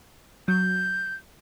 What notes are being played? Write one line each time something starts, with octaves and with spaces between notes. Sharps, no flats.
F#3 G6